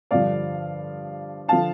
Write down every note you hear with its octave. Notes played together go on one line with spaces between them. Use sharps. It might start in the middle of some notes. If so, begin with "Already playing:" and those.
G2 D3 F3 D5 F5
D3 F3 F5 A5